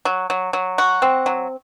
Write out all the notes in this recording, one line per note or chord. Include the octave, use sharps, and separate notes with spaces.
F#3
F#3
F#3
F#4
C4
F#3